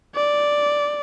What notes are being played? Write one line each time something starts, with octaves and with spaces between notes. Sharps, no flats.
D5